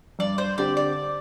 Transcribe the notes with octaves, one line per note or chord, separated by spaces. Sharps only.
G2 D5
C5
D3 C4 G4 D5
D5